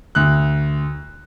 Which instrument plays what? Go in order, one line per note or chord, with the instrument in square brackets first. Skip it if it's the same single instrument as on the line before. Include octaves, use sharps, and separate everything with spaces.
[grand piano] D2 F#6